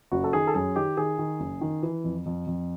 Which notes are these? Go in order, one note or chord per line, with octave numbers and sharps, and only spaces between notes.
F#1 F#4
A4
D#3 G#4
A4
F#2 G#4
D#3 G4
D#3 G#4
D#3
F#1
D#3
E3
F2
F2
F2